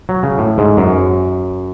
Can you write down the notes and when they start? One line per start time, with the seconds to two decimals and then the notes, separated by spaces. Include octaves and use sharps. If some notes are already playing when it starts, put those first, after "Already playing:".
0.09 F#3
0.23 C#3
0.38 A2
0.58 G#2
0.77 F#2